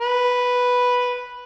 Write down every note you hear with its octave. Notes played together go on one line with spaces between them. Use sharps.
B4